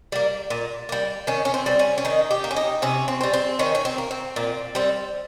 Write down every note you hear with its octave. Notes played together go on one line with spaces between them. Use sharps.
G3 A#3
A#2
G3 A#3
D#3 C#4
C#4
C4
G3 C4
C#4
C#4
D#3 D#4
G4
A#3
C#4
D#4
C3 C#4
C4
G3 C4
C4
D#3 C#4
C#4
C4
A#3
C4
A#2
G3 C4